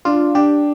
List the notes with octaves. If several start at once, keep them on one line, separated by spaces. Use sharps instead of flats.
D4 F4
D4 G4